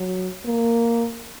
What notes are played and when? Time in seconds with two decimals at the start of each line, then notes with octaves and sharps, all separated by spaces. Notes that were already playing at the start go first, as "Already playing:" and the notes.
Already playing: F#3
0.45 A#3